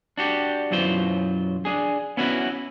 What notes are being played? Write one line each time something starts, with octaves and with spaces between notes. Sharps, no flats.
D4 F#4 G4
B1 F#2 E3 F#3 F4 C5
D4 G#4
B3 C#4 E4 F#4 A#4 B4